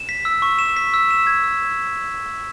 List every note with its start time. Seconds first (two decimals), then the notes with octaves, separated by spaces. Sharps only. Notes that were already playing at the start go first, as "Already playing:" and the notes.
Already playing: E7
0.09 B6
0.25 E6
0.42 C#6
0.59 E7
0.76 B6
0.94 E6
1.11 E7
1.27 G#6
1.44 E6